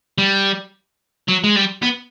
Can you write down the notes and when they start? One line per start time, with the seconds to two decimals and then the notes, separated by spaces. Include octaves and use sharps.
0.18 G3
1.28 F#3
1.44 G#3
1.56 G3
1.83 B3